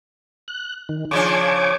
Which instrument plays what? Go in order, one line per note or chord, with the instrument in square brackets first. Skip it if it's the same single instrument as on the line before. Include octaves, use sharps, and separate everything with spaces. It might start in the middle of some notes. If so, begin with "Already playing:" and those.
[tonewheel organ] F#6
D#3
[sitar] C#3 F3 D4 [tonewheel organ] C#5 G#5 D6